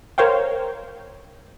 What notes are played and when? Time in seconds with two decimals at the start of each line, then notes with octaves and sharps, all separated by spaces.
0.18 A#4 C5 C#5 F5 G5